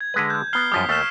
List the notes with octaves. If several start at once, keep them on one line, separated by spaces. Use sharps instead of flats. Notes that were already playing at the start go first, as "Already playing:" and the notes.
G#6
D3 G#3 B4
G6
B3 A#5 F6 C7 G7
F#2 F3 G3 D#6 B6
D#2 A3 C#6 F6 E7